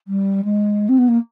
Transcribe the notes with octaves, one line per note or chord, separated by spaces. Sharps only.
G3
G#3
C4
B3
A#3